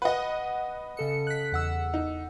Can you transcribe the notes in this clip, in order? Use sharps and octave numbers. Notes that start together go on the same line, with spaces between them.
B4 D#5 F#5
C#3 A4 C#7
F#6 B6
E2 F#5 E6
D#4